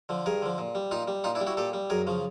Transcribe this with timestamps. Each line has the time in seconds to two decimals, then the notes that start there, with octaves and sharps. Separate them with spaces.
0.09 D3 F3
0.26 G2 G#4 A#4
0.42 D3 F3
0.58 A#2
0.75 G3
0.91 A#2 D#4 F4
1.07 G3
1.24 A#2 D#4 F4
1.35 D4 E4
1.40 G3
1.47 E4 F#4
1.57 A#2 G4 A4
1.73 G3
1.90 F#2 G#4 A#4
2.07 C#3 F3